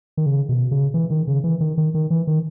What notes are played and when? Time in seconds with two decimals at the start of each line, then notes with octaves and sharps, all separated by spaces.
0.17 D#3
0.26 C#3
0.49 B2
0.71 C#3
0.94 E3
1.10 D#3
1.27 C#3
1.44 E3
1.60 D#3
1.78 D#3
1.94 D#3
2.10 E3
2.27 D#3